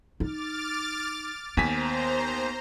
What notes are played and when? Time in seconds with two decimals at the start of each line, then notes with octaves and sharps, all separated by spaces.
0.20 D#4 D6 F6 A6
1.57 D#2 B3 C5 G#5 A#5 B6